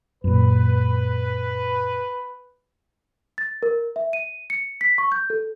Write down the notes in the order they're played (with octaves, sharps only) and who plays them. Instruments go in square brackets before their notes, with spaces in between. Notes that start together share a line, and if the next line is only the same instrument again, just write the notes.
[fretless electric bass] F#2 A#2 [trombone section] B4
[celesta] A6
A#4
E5
D#7
C#7
B6
C#6
G6
A4